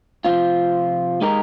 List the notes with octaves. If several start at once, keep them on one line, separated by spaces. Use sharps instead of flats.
C3 F3 C4 F4
G#3 D#4 G4 A#4